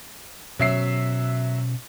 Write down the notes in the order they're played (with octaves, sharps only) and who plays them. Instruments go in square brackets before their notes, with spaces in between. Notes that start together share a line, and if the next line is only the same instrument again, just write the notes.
[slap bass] B2 C#4 [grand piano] F#3 E5 C7